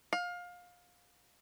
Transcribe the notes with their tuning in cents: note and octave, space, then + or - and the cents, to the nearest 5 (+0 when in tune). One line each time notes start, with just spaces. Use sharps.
F5 +25